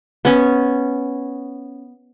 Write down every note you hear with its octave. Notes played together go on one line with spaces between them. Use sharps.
B3 C#4